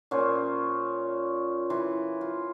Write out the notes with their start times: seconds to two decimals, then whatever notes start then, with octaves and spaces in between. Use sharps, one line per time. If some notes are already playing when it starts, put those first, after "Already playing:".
0.11 A#2 C#4 F4 C5
1.70 E3 C6
2.21 F4